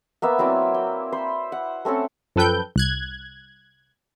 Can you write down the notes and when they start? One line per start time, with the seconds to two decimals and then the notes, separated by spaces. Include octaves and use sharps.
0.22 A#3 B3 E5
0.39 F#3 C4 E4 D5
0.74 G5
1.12 C5 B5
1.52 F#5
1.85 A3 C4 C#4 A4
2.36 F#2 F3 A4 B4 G5 G6
2.76 C2 F#6 G#6